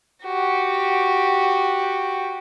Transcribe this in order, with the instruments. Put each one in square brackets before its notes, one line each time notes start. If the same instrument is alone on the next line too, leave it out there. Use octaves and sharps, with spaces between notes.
[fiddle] F#4 G4